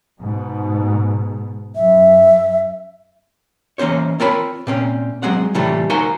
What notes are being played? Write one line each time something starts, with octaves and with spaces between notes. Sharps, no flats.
G#2 B2
F#2 E5
E3 A#3 C#4 C5 C#5
C4 F4 A#4 C#5 A5 B5
A#2 C4 C#4
F#3 G#3 C4 F#5
A2 C3 E3 F3 G3 A3
D#4 F#4 A#4 C5 F5 G#5